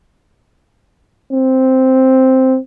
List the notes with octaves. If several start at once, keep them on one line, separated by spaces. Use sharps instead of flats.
C4